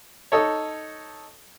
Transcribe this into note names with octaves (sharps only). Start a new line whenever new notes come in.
D#4 A4 C#5